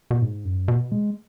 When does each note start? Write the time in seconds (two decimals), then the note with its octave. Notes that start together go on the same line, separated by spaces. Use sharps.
0.11 B2
0.22 G#2
0.45 F#2
0.68 B2
0.92 G#3